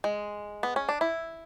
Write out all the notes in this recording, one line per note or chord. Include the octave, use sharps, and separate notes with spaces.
G#3
B3
C#4
D4
E4